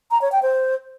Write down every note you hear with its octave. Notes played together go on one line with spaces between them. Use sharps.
A#5
C#5
G5
C5